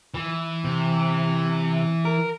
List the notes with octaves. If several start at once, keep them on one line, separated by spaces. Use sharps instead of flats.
E3
C3
A#4